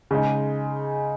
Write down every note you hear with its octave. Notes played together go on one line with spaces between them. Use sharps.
C#3 G#3 D#4